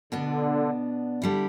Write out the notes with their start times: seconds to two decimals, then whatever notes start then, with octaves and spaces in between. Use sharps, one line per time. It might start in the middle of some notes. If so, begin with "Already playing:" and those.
0.12 B2 D3 B3 D4
1.22 D3 G3 E4